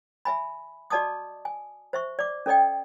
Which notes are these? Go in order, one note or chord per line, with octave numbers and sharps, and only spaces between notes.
E5 G#5 B5
F#4 D5 D#5 A5 D6 D#6
G#5
C5 E5 C#6
D5 D6
C#4 A4 D5 D#5 G5